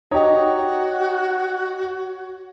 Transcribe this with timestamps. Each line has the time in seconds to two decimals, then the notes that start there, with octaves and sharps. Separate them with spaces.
0.11 D#4 F#4 G4 C#5